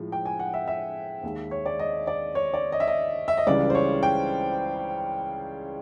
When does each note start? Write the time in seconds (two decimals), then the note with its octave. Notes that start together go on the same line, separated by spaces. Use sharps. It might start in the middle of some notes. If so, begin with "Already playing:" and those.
Already playing: A2 F3 G#3
0.12 G5
0.26 G#5
0.39 F#5
0.54 E5
0.67 E5
1.23 D#2 D#3 G#3
1.51 C#5
1.66 D5
1.79 D#5
2.07 D5
2.35 C#5
2.54 D5
2.72 D#5
2.80 E5
2.88 D#5
3.28 E5
3.37 D#5
3.47 C#2 C#3 E3 G3 D5
3.70 C5
3.75 C#5
4.03 G5